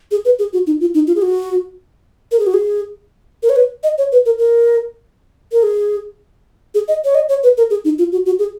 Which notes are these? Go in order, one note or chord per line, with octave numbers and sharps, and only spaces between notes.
G#4
B4
G#4
F#4
D#4
F4
D#4
F4
G#4
F#4
A#4
G#4
F#4
G#4
A#4
C#5
B4
D#5
C#5
B4
A#4
A#4
A#4
G#4
G#4
D#5
C#5
D#5
C#5
B4
A#4
G#4
D#4
F4
F#4
F#4
G#4